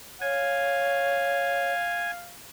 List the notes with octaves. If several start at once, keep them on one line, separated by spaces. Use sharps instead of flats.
C#5 F5 G#5